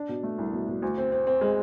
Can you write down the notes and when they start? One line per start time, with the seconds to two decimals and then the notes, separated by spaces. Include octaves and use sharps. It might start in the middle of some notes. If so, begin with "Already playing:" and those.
Already playing: D4
0.09 B2
0.23 A3
0.38 C2
0.53 B2
0.68 B2
0.82 D2
0.98 C4
1.12 C4
1.27 C4
1.41 G#3